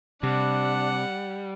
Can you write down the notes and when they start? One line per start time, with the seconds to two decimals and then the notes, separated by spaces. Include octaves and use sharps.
0.23 C3 G3 D4 F#5